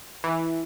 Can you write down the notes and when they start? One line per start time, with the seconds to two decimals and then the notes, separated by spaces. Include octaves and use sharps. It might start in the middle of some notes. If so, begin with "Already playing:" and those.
0.24 E3